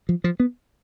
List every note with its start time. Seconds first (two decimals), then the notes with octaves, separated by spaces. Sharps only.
0.09 F3
0.24 F3
0.40 B3